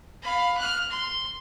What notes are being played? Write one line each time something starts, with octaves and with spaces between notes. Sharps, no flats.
F5 B5
F6 F#6
C6